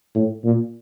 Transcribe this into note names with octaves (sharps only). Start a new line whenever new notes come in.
A2
A#2